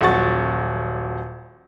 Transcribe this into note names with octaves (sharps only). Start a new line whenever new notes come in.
D#1 A#1 F#3 F#5 C#6 A6